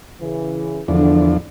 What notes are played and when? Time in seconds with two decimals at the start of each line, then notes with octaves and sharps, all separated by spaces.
0.21 C#3 E3
0.88 E2 D3 F3 D4